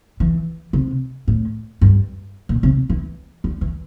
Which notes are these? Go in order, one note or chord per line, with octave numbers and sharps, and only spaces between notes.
E3
C3
A2
G2
A#2
C3
E3
G3
E3